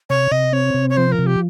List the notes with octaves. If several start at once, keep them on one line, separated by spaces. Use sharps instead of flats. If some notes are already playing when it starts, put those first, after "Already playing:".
C3 C#5
C3 D#5
C4 C#5
C3
C#5
F3 C5
A#4
C3
G4